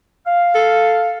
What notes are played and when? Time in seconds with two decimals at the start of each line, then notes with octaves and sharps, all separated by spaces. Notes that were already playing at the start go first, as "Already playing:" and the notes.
0.26 F5
0.55 A4